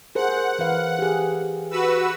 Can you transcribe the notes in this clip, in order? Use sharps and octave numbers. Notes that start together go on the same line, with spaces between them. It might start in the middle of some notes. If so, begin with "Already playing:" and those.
G#4 A#4 C5 F#5
E3 B4 F5
G4 G#4
F#4 B4 E6